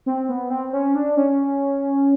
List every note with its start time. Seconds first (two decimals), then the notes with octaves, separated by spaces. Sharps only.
0.06 C4
0.29 B3
0.50 C4
0.73 C#4
0.95 D4
1.17 C#4